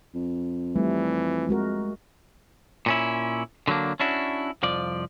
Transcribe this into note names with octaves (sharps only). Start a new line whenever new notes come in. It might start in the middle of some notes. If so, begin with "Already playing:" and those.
F2
E3 G3 A3
G#3 F#4 A#4
A#2 C#4 E4
D3 F#3 G3 A#3 D4
C#4 D4 E4 F#4
C2 F2 F3 D5